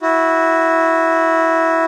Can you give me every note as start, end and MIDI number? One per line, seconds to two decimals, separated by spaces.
0.01 1.85 64
0.01 1.85 66